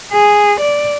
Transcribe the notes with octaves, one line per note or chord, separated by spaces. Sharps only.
G#4
D5